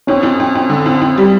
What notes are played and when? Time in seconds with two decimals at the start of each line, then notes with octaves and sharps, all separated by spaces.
0.07 F2 C#4
0.23 F2
0.40 F2
0.55 F2
0.70 D3
0.86 F2
1.01 F2
1.17 G3